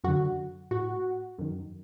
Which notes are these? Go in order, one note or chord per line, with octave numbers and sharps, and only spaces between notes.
F#2 D3 F#4
A2 F#4
F#2 D#3